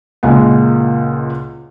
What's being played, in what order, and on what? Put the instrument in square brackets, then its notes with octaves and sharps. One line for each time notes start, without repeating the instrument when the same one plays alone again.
[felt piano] C#2 A#2 G#3 F#5